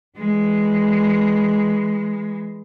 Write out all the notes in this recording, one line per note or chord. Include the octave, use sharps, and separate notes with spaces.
E3 G#3